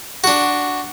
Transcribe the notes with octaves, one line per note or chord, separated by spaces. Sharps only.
D4 F#4